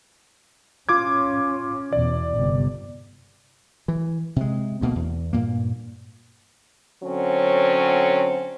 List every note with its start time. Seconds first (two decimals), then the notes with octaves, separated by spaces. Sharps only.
0.89 C#4 F4 D6 G#6
1.93 E2 B2 D5
2.37 G1 G2 C3
3.88 E3
4.36 C3 G#3
4.81 D2 B2 A#3
4.95 E2
5.33 G2 A#2 A#3
7.03 D3 F#3 C4 C#4